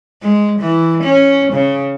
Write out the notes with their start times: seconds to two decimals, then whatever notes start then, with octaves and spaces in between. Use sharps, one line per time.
0.22 G#3
0.60 E3
1.03 C#4
1.53 C#3